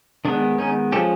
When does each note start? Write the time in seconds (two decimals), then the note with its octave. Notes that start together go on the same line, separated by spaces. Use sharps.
0.25 D#3 G#3 B3 D4
0.58 C#4 D#4
0.92 F3 G#3 C#4 G4 A4